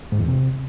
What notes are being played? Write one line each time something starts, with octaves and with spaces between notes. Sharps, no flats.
G#2
E2
C3